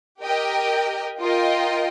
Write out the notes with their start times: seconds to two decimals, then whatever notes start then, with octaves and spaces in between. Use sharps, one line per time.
0.22 G4 A#4 D#5 G5
1.20 F4 A#4 D#5 G5